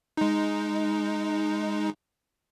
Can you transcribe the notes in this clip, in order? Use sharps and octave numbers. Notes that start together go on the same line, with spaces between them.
G#3 D#4